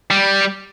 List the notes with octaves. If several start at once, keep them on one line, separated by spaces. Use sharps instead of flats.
G3